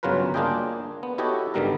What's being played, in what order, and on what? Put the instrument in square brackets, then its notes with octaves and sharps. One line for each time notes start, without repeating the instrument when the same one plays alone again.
[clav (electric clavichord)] G1 C#3 F#3 F4 A#4 B4
A#3 D4 F4 G#4 D#5 G5
B3
E4 F#4 G4 A4 C#5 D#5
G#1 D3 D#3 G3 B3 A#4